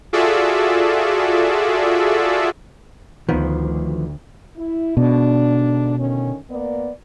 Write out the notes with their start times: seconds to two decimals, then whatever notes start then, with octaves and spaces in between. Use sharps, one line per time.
0.13 F4 F#4 G#4 A4 D5 E5
3.29 D2 D#3 F3 B3
4.58 E4
4.97 G#2 B2 D3 D4
5.98 D3 D#3 C#4
6.51 A#3 B3 D5